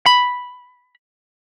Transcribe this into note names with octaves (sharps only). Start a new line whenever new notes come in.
B5